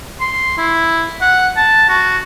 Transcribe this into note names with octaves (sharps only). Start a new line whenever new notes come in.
C6
E4
F#5
A5
F#4